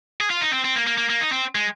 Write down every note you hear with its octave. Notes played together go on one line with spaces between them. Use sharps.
G#4
F4
D#4
C4
C4
A#3
A#3
A#3
A#3
D#4
C4
G#3